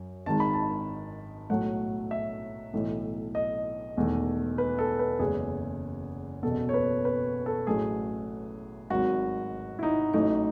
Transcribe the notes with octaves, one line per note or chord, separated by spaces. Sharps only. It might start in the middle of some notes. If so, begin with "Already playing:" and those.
Already playing: F#2
G#1 G#2 D#3 G#3 A5
B5
A5
B1 A2 F#3 A3 F#5
E5
B1 A2 E3
D#5
E1 E2 D#3 A3
B4
A4
B4
F#1 E2 C#3 G#3 G#4
F#1 E2 B2 A4
C#5
B4
B4
A4
A1 A2 F#3 A3 G#4
G#1 G#2 F#3 F#4
E4
D#4
A1 A2 F#3 A3 D#4